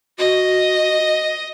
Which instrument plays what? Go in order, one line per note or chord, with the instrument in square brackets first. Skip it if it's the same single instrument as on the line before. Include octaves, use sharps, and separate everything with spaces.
[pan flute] F#4 [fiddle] D#5